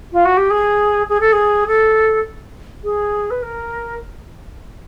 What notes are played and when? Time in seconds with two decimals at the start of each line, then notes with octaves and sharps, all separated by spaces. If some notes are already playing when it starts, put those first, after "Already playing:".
0.12 F4
0.25 F#4
0.37 G4
0.50 G#4
1.09 G#4
1.20 A4
1.32 G#4
1.67 A4
2.83 G#4
3.30 B4
3.42 A#4